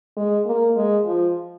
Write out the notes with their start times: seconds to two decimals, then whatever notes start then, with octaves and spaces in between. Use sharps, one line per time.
0.17 G#3
0.47 A#3
0.76 G#3
1.05 F3